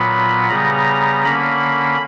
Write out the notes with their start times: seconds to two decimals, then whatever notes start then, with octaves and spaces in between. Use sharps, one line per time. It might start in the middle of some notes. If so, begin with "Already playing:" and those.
Already playing: A#2 F#3 B3 B5
0.49 C#3 G3 B3 A#5
1.23 D3 A#3 C#4 B5